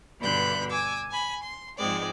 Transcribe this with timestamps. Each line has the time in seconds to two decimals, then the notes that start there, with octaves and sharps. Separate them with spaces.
0.19 G2 B2 D3 B5 F#6 G6
0.69 G#5 D6 E6
1.10 G#5 B5
1.42 C6
1.77 G#2 F3 G#3 C4 D5